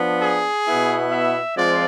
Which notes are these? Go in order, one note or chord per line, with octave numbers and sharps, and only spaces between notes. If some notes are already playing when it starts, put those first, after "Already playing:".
Already playing: F3 B3 D4
G#4
B2 B3 E4
E5
F3 G#3 C4 F4 D5